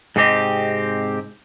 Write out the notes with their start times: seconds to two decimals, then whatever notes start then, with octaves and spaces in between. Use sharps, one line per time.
0.16 G#2 C3 C4 G4 D#5